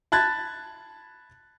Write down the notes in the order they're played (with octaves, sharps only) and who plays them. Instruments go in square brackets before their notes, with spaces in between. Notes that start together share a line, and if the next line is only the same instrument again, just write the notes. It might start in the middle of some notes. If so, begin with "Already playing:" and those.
[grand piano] A5 B5 F#6 G#6 A6